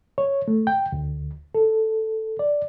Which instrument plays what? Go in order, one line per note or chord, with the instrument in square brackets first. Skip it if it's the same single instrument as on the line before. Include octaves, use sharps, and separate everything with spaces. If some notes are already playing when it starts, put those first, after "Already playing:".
[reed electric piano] C#5
A3
G5
D2
A4
D5